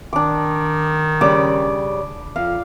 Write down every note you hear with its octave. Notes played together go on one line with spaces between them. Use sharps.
D#3 D4 D6
C#3 G3 C#4 B5 D6
F2 F5